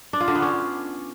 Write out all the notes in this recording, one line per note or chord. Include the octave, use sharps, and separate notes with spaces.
D4
F4
D3
B3
C#4